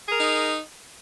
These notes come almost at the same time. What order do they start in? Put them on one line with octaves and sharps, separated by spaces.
G#4 A#4 D#4